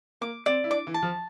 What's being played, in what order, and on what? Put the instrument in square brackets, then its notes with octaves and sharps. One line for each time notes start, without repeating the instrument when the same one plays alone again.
[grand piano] A#3 [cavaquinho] D6
[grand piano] C4 [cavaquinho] D5
[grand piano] E4
[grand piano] D4 [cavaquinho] D6
[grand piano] E3
[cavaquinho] A5
[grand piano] F3